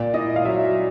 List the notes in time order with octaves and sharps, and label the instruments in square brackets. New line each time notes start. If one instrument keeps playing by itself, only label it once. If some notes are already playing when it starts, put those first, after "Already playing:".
Already playing: [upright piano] A#2 D5
E4 D#5
F5
F#3 E5